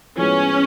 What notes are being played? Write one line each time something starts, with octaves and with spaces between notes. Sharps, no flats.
A2 F3 G#3 B3 C#4